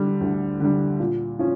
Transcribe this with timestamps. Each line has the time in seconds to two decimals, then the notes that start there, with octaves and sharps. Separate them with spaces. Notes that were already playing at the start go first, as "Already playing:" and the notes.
Already playing: D3 G3
0.21 D2
0.60 D3 G3
1.00 A#2
1.39 F3 C#4